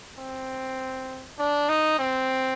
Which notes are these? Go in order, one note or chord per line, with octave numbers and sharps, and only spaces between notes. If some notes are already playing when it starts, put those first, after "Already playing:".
C4
D4
D#4
C4